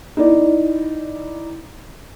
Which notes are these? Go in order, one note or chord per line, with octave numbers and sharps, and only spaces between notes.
D#4 E4 D5